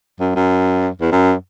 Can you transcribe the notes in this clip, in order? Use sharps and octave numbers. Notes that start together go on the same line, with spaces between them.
F#2
F#2
E2
F#2